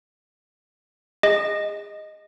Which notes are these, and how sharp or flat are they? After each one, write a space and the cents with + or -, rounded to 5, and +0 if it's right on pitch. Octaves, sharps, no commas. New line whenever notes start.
G#4 -30 D#5 +0